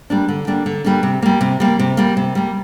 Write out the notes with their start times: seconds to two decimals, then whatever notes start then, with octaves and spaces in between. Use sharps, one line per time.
0.10 G3 A#3 D4
0.28 D3
0.47 G3 A#3 D4
0.66 D3
0.84 G3 A#3 D4
1.03 C3
1.22 G3 A#3
1.41 C3
1.60 G3 A#3
1.79 C3
1.97 G3 A#3
2.17 C3
2.35 G3 A#3